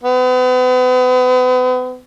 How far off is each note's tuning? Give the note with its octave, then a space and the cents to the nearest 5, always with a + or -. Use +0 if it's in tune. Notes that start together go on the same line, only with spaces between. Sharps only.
B3 +40